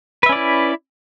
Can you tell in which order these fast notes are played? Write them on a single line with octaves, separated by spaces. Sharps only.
B4 E5 C#4 D5 E4